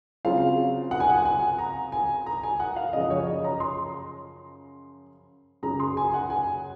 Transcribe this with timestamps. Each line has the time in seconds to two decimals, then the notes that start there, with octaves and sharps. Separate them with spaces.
0.25 C#3 F#3 C4 F4 F5
0.91 F#5
1.00 G#5
1.09 F#5
1.26 G#5
1.59 A#5
1.92 G#5
2.26 A#5
2.43 G#5
2.60 F#5
2.76 F5
2.93 F#2 C#3 F3 D#5
3.10 C#5
3.27 D#5
3.44 A#5
3.60 C6
5.63 F#2 C#3 F#3 A#5
5.80 C6
5.97 G#5
6.14 F#5
6.30 G#5